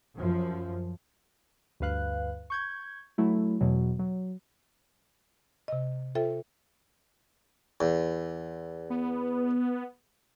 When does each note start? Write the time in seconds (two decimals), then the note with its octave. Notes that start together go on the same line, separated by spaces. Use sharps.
0.17 F#2 F3
1.80 D2 G2 B4 F5 F#6
2.50 C#6 G6 G#6
3.18 F#3 A3 E4
3.61 E2 B2 F#3
3.99 F#3
5.68 C3 D#5
6.15 F4 A4 C5 E5 G5
7.81 E2
8.90 B3